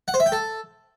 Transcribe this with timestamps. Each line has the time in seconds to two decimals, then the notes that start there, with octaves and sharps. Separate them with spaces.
0.08 F#5
0.14 C5
0.20 E5
0.26 G5
0.32 A4